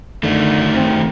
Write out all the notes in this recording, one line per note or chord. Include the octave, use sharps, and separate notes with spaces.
D3 D#3 A3
C4